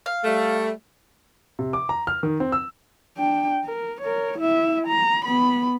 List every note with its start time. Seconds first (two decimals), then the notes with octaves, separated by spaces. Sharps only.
0.06 F5
0.24 G3 A3
1.59 C3
1.73 D6
1.89 A#5
2.07 F6
2.23 D#3
2.40 C4
2.52 E6
3.18 D4 G5
3.65 A#4
4.01 A#4 C#5
4.39 E4 E5
4.87 A#5
5.25 B3 B5